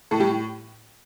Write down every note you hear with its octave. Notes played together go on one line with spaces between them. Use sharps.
A2 A4
G3 G4
A2